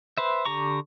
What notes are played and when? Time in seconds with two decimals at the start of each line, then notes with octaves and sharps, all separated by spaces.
0.18 B4 C5 E5
0.45 D3 G4 A#5 C#6